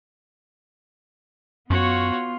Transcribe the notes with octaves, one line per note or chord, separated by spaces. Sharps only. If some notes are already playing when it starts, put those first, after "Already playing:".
F#2 B3 F4 F#4 C#5